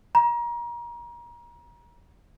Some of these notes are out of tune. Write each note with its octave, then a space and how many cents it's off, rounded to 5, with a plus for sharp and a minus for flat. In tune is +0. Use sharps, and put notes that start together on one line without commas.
A#5 +30